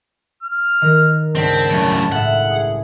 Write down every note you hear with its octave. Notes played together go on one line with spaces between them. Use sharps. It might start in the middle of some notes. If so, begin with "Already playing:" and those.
F6
D#3 A#4
C#2 G2 C4 A5 B6
F#2 A2
A2 E5 F#5
G#4